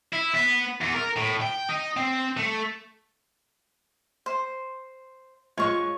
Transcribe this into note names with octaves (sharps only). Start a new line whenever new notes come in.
E4
B3
E2
A#4
A2
G5
D#4
C4
A3
C5
G#3 F4 C#5 C#6